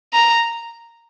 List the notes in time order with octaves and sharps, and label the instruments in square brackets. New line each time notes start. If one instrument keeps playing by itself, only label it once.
[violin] A#5